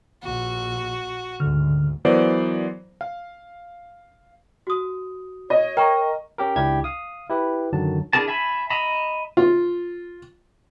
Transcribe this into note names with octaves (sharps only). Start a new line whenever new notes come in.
A#1 F#4
D2 G#2 D3 F6
E3 F#3 B3 A#4 C5 D5
F5
F#4 D#6
C#5 D#5
A#4 G5 A#5 C#6
C#4 G4 A#4
C#2 D4 E4 G4 G#6
F5 D#6
E4 G4 B4
F#2 D3 D#3 F#3 A5
D4 E4 G#4 A#4 A5
E5 G#5 A5 B5
D#5 E5 A#5 B5
F4